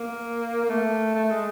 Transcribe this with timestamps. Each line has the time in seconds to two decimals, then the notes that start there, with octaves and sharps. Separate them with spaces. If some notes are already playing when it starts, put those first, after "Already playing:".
Already playing: A#3
0.64 A#3
0.69 A3
1.15 A3
1.30 G#3